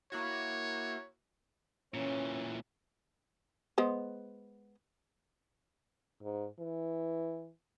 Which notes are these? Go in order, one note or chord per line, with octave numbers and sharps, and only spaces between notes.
A#3 E4 F#4 C#5
A#2 E3 C#4
G#3 B3 C5
G#2
E3